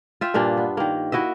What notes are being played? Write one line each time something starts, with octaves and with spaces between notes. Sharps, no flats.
F4 E5 G5
G2 A#2 A#3 D4
B3
D#3 A#3
E4 F#4 D#5 E5